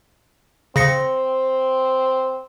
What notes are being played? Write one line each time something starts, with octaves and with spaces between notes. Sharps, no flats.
C#3 C4 A#6 C#7